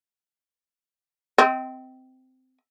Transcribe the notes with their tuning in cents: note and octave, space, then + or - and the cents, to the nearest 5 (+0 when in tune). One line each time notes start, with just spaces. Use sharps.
C4 -15 D#5 +30